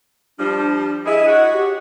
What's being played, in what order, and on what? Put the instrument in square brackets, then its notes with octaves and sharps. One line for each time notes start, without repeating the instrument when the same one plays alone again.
[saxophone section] F3 G3 [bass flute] D4
[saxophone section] E4 G#4 [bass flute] D#5
[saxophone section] F#4 C#5 F#5
[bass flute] G4